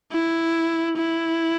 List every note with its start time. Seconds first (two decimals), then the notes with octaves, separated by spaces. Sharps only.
0.12 E4
0.97 E4